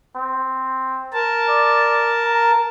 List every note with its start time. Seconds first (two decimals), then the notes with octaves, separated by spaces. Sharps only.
0.15 C4
1.13 A#4 A5
1.49 D5
2.24 A#5